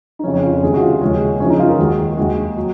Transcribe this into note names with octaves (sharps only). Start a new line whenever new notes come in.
D#4
F2 C#3 F3 C#4
C#4
F4
C#2 C3 D#3 G#4
F#4
F4
D#2 C#3 F3 G#3 C#4
F#2 C#3 F3 C#4
D#4
F4
A#4
D#2 D#3 G#3 F#4
D#2 D#3 G#3 F#4
F#3